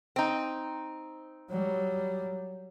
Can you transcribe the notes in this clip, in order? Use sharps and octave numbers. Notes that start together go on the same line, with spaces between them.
C4 D#4
F#3 G3